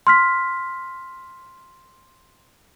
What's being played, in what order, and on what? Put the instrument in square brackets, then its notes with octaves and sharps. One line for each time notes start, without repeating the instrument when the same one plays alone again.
[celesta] C6 F6 B6